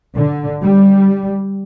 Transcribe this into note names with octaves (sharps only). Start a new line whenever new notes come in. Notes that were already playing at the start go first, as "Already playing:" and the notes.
D3
G3